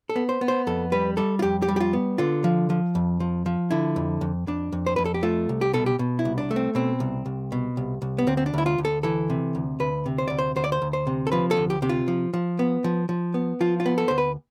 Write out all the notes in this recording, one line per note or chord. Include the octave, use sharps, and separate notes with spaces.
A4
B3
C5
B3
C5
F2 A4
G3 B4
G3 A4
F4
F2 G4
G4
G3
G4
F4
B3
D3 F4
F3
F3
F2
F3
F3
D3 E4
F2
F2
F2 D4
F2
C5
F2 B4
A4
G4
A3 F4
C2
G4
B2 A4
G4
B2
E4
C2
D4
A3
C4
B2 C4
C2
C2
B2
C2
C2
B3
D2 C4
C4
D4
D2 E4
F4
D2
A4
E3 A4
C3
D2
D2 B4
C3
C5
D2 D5
C5
D2 C5
D5
C5
D2
C5
C3
A4
F3 B4
A4
D2
G4
C3 G4
F4
F3
F3
B3
F3
F3
B3
F3 F4
F4
B3
A4
D2 C5
B4